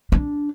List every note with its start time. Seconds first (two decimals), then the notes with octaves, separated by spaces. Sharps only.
0.12 D4